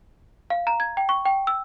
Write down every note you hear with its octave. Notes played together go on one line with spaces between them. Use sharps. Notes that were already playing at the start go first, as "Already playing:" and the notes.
F5
A#5
G#6
G5
C#6
G5
E6